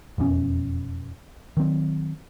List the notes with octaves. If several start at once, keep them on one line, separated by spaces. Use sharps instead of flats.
E1 F2 B2 C#4
D#3 F#3 C4